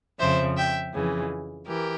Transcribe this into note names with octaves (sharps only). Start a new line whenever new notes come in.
F2 C#3 F3 C5 E5
E5 G5
F2 C#3 E3
E3 G4 A#4